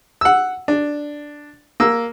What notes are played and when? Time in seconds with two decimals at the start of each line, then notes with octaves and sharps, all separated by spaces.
0.21 F#5 E6
0.68 D4
1.80 A#3 E6